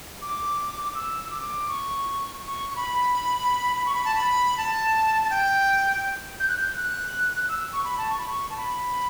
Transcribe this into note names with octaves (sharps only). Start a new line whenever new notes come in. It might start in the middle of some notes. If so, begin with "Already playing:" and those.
D6
E6
E6
D6
C#6
C#6
C#6
B5
C#6
B5
A5
B5
A5
A5
G5
G6
F#6
G6
F#6
E6
C#6
B5
A5
C#6
B5
C#6
A5
B5